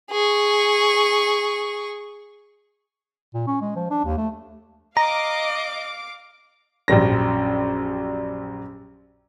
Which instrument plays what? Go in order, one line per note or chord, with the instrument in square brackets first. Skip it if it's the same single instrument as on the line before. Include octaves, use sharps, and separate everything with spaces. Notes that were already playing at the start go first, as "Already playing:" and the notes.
[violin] G#4 C#6
[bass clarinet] A#2
C#4
G#3
F3
D4
D#2
A3
[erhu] D#5 [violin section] F5 D6 [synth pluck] A#5
[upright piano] A#1 F#2 G3 A#6